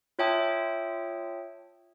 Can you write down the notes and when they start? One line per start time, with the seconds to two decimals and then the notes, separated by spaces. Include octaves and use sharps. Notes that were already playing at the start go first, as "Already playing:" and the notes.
0.19 F4 C#5 E5 G5 A5 D#6